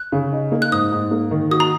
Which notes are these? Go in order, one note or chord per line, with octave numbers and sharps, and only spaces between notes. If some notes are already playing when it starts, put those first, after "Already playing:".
Already playing: F#6
C#3
D#4
A#3
F#6
G#2 D#6
G#2
A#3
D#3
F#4 D#6
A#5